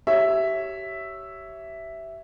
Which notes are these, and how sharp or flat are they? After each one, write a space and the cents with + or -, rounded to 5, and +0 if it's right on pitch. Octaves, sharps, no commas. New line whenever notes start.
G4 -30 C#5 +0 E5 +0